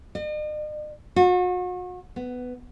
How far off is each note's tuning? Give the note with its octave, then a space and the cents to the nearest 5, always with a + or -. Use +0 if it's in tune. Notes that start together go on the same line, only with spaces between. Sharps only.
D#5 -45
F#4 -40
B3 +10